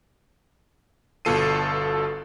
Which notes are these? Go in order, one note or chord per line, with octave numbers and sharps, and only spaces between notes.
G1 B2 F4 A4 C7 D#7